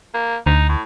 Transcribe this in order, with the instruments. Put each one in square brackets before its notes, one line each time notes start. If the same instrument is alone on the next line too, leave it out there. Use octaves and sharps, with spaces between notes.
[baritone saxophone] A#3
[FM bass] D2 [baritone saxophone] D#4
[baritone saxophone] A2